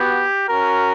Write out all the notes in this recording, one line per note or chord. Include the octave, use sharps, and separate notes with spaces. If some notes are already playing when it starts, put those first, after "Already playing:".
Already playing: B3 F#4 G4
C#4 F#4 A#4